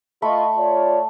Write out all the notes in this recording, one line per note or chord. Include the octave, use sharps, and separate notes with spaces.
A3 F4 D#5 B5 C#6
F4 C#5 D5